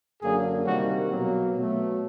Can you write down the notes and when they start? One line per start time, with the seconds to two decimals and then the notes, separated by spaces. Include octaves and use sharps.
0.22 F#2 D3 F#3 A#3 G#4
0.66 C3 D#3 G3 A#3 F#4
1.10 B2 F#3 A#3
1.55 B2 F#3 A3